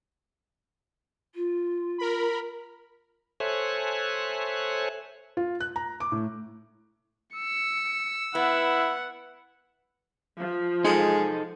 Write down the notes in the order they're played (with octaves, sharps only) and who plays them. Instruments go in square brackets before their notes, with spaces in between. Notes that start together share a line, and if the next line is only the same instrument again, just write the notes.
[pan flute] F4
[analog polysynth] A#4 B5
[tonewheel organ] A4 C5 C#5 E5 G#5 F#6
[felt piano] F4
F#6
A#5
D6
A2
[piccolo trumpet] E6 [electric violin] C#7
[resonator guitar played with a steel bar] B3 [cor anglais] E4 [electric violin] F#5
[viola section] F3
[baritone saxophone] G#3 [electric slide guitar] D#4 A4